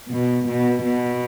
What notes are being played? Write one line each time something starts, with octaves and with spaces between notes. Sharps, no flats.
B2
B2
B2